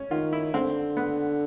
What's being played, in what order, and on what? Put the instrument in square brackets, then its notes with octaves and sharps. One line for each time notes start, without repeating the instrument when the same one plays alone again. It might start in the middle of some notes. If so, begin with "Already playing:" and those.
Already playing: [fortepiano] C#4
[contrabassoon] D#3 [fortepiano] F4
[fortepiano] E4
[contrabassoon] D3 [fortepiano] C4
[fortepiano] B3